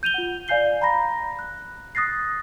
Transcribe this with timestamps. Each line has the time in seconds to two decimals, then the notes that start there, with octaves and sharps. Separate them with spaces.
0.03 G6 D#7 F7 G7
0.14 F4 F#5
0.48 D5 F5 G#5 G6 C7 G7
0.82 A#5 B5 A#6
1.39 F#6
1.95 D#6 F#6 A6 A#6 C7